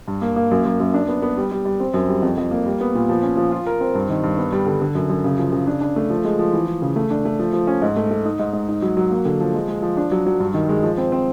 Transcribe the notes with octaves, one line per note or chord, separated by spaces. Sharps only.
G2
A#3
A#3
F#2
F#2
F#2
D4
B3
B3
G3
G3
G3
C4
F#2
G3
F2
F2
A#3
G3
B3
A#2
F3
C#4
F3
F4
A#4
C4
G2
D#3
G2
B3
G3
D3
D3
F#2
F#2
C#3
F3
C#3
D4
D4
A3
F3
G#3
F3
E3
E3
C#3
A3
D4
A3
F3
F3
C#4
G#2
A3
A3
D#4
G#2
G#2
D#4
F#3
F#3
A#3
D3
F3
G#3
G#3
F3
D4
F#3
F#3
G2
D#3
G#3
F3
C4
C4